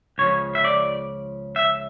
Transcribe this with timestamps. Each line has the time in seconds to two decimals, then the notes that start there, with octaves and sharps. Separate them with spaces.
0.18 C#2 C#3 F3 C#5
0.55 E5
0.65 D5
1.56 E5